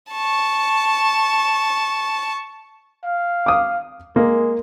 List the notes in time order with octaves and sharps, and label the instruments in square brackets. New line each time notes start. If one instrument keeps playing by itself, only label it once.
[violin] A5 C#6
[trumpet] F5
[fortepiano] D6 D#6
[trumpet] G#3 [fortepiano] A#3